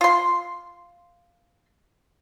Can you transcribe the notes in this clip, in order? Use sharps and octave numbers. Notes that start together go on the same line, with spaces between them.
F4 C6